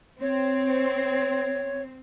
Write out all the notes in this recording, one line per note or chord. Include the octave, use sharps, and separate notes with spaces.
C4 C#5